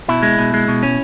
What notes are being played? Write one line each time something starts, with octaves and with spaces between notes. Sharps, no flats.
B2 E4
G#3
B2
G#3
B2
C#4